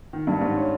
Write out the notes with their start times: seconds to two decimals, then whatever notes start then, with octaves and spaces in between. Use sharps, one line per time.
0.13 D#3
0.27 G2
0.41 G#2
0.56 C#4